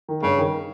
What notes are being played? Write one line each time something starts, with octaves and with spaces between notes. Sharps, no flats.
D#3
G2 C#3
D#3